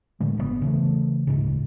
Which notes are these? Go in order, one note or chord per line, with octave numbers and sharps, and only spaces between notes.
A2 D3 G#3
G1 D#3 B3
C#3 E3 A3
D1 G1 G#2 C#3